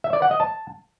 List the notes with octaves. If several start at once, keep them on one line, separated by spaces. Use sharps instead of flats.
E5
D5
F#5
D#5
A5